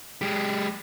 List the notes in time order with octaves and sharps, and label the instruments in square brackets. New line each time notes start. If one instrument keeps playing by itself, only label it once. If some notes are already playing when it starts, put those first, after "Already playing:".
[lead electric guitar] G#3 G4